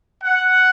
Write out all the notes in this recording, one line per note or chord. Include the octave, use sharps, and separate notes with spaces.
F#5